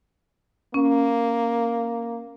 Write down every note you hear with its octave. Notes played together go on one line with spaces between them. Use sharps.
A#3 C#4